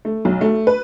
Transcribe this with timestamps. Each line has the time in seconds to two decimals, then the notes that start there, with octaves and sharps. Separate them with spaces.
0.05 A3
0.25 B1
0.41 A3
0.67 B4